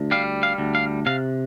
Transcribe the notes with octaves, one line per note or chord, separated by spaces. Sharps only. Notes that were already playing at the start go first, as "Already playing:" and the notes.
Already playing: D2
G3 F5
F5
D2
F5
C3 F5